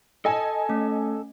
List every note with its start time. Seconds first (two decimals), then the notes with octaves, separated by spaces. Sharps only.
0.25 A4 D#5 G#5 A5
0.69 A3 C#4